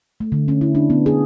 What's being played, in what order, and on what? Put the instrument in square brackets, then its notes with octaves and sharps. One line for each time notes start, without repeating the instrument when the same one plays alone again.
[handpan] A3
D3
C#4
E4
D4
B3
G#4